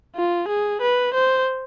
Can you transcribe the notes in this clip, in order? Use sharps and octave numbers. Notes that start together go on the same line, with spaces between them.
F4
G#4
B4
C5